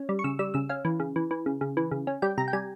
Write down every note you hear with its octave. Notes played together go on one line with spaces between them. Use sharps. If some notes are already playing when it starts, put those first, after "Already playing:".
Already playing: C#4
G3
C#6
C#3 E6
G3 E6
C#3 E6
C#4 F5
E3
C#3
E3
E3
C#3
C#3
E3
C#3
C#4
G3 G5
C3 A#5
G5
G3 G#5